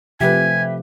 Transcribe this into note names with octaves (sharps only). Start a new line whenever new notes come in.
C3 F3 A3 G4 B4 E5 G#5